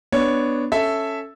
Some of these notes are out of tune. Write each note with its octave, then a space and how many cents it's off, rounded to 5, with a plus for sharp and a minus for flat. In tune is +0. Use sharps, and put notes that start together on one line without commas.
B3 +0 D4 +0 C#5 +0
C#4 +0 A4 +0 E5 +0